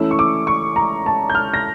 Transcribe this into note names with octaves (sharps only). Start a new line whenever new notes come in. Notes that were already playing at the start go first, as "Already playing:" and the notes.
Already playing: E3 A3 C#4 E4 E6
C#6
D6
C#6
A#5
A5
G6
F6
A#6